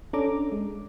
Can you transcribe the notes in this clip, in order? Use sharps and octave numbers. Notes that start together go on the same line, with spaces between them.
C#4 D4 A4 A#5 D6
G#3